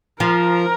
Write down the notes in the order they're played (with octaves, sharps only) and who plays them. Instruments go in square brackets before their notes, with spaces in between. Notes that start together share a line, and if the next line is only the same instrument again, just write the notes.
[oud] F3 [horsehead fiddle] A#4